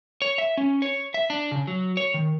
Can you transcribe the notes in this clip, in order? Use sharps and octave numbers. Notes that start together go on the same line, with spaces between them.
C#5
E5
C#4
C#5
E5
D4
C#3
F#3
C#5
D#3